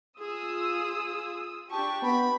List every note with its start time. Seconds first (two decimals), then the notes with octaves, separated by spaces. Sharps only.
0.20 F4 G#4 D#6 E6
1.71 D4 G4 A5 C#6
2.03 B3 B5